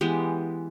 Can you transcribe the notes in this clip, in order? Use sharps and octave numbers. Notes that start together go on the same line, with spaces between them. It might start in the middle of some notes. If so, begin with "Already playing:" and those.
E3 G#3 B3 G4